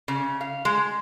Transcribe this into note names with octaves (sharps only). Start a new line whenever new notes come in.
C#3
F5
G#3